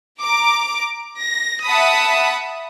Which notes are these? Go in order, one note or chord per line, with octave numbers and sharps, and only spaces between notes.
A#5 D6
A#6
E5 F#5 A5 B5 D#6